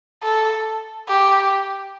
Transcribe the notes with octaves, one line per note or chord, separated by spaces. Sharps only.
A4
G4